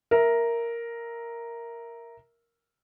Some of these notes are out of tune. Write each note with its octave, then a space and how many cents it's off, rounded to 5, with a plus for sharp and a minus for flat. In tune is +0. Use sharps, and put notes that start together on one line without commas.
A#4 +0 E5 +0